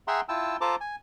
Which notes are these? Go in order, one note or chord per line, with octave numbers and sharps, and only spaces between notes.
G#4 E5 F#5 G5 A#5 C6
E4 F4 G5 A5 E6
F4 A4 C5 A5 A#5 D6
G#5